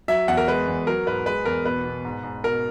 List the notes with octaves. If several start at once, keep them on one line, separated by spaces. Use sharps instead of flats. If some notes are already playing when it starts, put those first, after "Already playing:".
F#3 E5
E2 F#5
A#4
G#3 B4
E2
F#3 A#4
G#2 B4
G#3 B4
E2 A#4
B2 B4
B2
G#2
G#2
B2 A#4